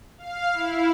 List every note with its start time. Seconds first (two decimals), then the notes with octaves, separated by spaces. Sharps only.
0.18 F5
0.52 E4